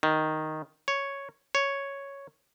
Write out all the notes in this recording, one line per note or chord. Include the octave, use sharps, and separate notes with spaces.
D#3
C#5
C#5